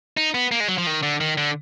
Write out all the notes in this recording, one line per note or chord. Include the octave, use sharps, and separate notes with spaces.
D#4
B3
A#3
G#3
F#3
F3
D#3
D3
D#3
D3